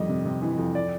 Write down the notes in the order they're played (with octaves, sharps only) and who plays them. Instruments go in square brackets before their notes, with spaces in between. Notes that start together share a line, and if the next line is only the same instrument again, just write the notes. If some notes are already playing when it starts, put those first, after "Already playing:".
Already playing: [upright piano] F2 D#3 G3 D#5
C3
C3
E3
F2
D5